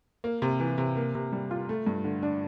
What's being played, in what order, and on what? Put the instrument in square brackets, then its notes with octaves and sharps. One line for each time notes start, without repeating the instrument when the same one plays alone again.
[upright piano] A#3
C3
E3
C3
A#3
C3
G3
F4
A3
G2
D3
D4